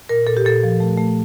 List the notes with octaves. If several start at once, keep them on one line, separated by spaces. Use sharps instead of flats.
A#2 A#4
A#2 A4
G4
A#2 A4
F3
A3
A3